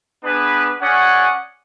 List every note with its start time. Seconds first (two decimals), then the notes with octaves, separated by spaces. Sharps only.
0.23 B3 D4 G#4 B4
0.81 C#4 G#4 D5 F#5